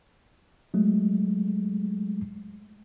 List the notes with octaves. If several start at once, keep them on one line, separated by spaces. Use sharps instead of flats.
F#3 G#3 A3